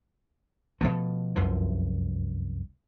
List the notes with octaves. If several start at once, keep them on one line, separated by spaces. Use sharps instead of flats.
B2 F3 A3
F1 C2 F#2 F3